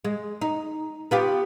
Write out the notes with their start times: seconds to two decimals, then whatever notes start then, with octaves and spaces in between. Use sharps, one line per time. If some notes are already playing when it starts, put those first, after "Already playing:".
0.05 G#3
0.41 D#4
1.11 B3 F4 G4